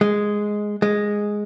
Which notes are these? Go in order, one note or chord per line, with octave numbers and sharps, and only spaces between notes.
G#3
G#3